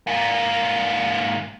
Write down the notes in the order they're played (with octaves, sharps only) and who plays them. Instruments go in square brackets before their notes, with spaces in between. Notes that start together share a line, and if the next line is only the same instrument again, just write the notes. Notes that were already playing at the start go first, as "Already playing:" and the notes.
[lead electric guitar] G#2 A#3